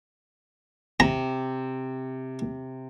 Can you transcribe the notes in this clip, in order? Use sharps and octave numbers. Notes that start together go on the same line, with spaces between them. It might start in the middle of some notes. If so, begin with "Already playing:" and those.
C3 A#5